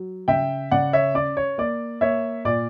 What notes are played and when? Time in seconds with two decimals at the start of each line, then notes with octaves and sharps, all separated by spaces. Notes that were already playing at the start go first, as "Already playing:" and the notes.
Already playing: F#3
0.28 C#3 E5 G5
0.71 C#3 D5 F#5
0.93 C#5 E5
1.14 C#4 D5
1.37 C#5
1.58 A#3 D5
2.01 A#3 C#5 E5
2.45 A#2 D5